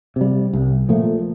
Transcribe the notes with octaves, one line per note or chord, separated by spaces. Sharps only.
C3 G3
C2
A#2 F3 A3